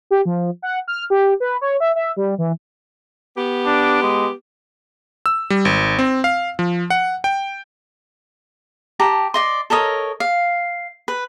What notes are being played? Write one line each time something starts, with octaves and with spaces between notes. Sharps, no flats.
G4
F3
F#5
F6
G4
B4
C#5
E5
E5
G3
E3
B3 G4
D4
G#3
E6
G3
G#1
C4
F5
F3
F#5
G5
G4 A5 A#5
D5 D#5 C6
A4 A#4 C#5 D#5
F5
B4